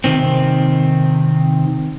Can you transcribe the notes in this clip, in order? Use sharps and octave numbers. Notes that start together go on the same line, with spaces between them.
C3 D#3 C4